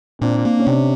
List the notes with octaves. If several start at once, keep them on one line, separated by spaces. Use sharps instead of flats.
A#2 C4 D4
A#3
C#4
C3 C4 D4